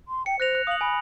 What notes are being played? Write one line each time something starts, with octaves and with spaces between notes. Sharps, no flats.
C6
G5 C#7
C5 F#6 A#6 F7
F#6
F5 D#6 F#7
G#5 B5